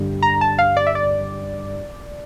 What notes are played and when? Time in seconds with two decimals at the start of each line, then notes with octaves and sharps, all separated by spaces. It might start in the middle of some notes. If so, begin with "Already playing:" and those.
Already playing: G2 D3 G3
0.22 A#5
0.41 A5
0.59 F5
0.77 D5
0.87 E5
0.95 D5